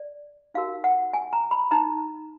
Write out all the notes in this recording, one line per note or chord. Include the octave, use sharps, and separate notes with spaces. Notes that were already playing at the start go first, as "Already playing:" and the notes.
Already playing: D5
D#4 F#4 A#4 F5
F#5
G#5
A#5
B5
D#4 A#5